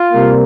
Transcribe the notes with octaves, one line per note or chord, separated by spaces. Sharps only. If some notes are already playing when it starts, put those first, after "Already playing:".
Already playing: F4
C3 G3 A#3